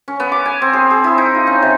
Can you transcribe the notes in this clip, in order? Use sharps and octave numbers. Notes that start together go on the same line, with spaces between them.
C#4
B3
D6
G#5
C4
G#4
G#4
E4
D#4
F4
C#4
C3